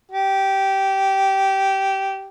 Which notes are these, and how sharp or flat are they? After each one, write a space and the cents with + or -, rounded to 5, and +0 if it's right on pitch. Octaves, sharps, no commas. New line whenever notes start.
G4 -15